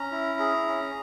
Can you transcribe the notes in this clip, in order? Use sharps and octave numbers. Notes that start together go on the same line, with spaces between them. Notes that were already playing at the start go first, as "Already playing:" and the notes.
Already playing: C#4 A#5
E4
G#4
C#4